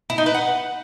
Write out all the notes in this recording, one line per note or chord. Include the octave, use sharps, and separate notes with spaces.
E4
D#4
B4
F#5